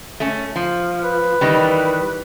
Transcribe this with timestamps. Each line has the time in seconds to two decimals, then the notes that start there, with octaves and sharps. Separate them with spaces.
0.20 A3 C#4
0.56 F3
1.04 B4
1.41 D#3 E3 G3